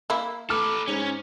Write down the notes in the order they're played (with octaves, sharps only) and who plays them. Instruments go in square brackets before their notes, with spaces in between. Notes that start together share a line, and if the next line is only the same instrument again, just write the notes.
[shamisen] A#3 E4
[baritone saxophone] A3 [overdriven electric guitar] A4 B4 [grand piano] D6 F6
[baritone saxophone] G#2 [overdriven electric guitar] C#4